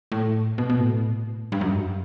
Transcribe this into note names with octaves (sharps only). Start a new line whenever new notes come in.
A2
B2
B2
A2
G2
F#2
G2